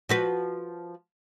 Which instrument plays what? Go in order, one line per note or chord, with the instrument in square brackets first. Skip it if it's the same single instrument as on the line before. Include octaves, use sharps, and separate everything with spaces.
[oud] F3 F#4 B4